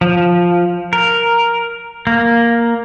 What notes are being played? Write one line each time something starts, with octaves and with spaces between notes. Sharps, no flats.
F3
A#4
A#3